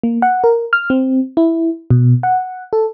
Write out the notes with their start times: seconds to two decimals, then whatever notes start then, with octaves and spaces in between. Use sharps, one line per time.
0.03 A#3
0.22 F#5
0.44 A#4
0.73 F6
0.90 C4
1.37 E4
1.90 B2
2.23 F#5
2.73 A4